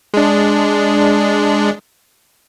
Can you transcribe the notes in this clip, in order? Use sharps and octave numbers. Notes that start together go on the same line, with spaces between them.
G#3 D4